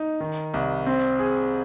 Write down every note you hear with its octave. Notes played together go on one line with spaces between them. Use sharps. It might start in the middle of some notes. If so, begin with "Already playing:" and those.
Already playing: D#4
D#3
C2
C4
G#4